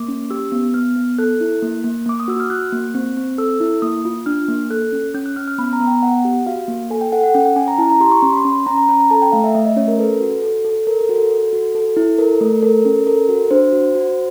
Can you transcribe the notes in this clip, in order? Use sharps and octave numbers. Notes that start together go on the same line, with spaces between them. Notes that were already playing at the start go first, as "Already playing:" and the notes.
Already playing: A#3 D6
C#4
G4 E6
B3
B3 F6
B3
A4 F#6
E4
A#3
A#3
A#3 D6
D#6
F#4 E6
F6
F#4 F#6
A#3
C4
C4
A4 E6
E4
A#3 D#6
F4
D4 F6
A#3
A4 F#6
C#4
C#4 G6
F#6
C#4 F6
F6
B3 B5
A#5
B3
G5
B3 F#5
G4
F#4 F5
A#3
A4 G#5
G5
A4 F#5
F#5
C#4 G5
G5
C#4 G#5
A#5
E4 A5
A#5
G4 C6
C#6
C#4 C6
B5
C6
C#4
B5
C#4 A#5
A#5
C#4 B5
A#5
A4 A5
G5
A3 F5
E5
A3 E5
D#5
C#4 C#5
A#4
A4 B4
F#4
A4
A4
A4 A#4
A#4
F#4
A4
A4
F#4
A4
E4
A4 A#4
A3
A4 A#4
C#4
A4 A#4
F#4
D4 C5
F#4
F#4